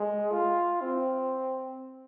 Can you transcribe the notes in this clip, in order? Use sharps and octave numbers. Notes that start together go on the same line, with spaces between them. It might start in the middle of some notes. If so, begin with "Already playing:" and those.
Already playing: G#3
F4
C4